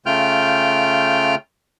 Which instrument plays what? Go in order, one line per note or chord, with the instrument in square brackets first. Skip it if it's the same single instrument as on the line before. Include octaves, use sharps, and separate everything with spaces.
[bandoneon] C#3 A3 F4 G5 F6 G6